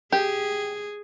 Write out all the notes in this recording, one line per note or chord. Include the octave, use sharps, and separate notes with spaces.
G4 G#4